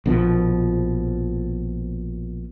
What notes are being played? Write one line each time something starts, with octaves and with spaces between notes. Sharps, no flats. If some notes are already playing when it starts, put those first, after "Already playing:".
A#1 B2 D3 F3